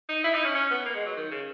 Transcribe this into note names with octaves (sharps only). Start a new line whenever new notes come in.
D#4
E4
D#4
C#4
C#4
B3
A#3
G#3
F#3
D#3
C#3